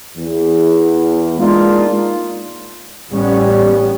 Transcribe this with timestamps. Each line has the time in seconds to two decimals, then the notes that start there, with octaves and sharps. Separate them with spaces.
0.17 E2
1.38 G#3 A#3 D4 D#4 F4
3.13 A1 G3 B3 C#4